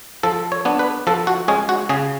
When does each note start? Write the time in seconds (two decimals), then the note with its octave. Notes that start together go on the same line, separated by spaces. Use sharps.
0.23 F3 A4
0.52 C#5
0.65 B3 D4
0.79 B4
1.07 F3 A4
1.27 F#4
1.48 G#3 C#4 G#4
1.69 F#4
1.89 C#3 G#4